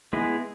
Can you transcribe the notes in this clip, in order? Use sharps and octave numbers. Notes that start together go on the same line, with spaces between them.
G#3 B3 E4 G#4